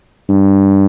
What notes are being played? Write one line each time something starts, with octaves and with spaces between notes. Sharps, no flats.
G2